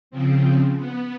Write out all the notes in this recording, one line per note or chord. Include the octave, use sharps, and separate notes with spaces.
C#3 F3 C4
B3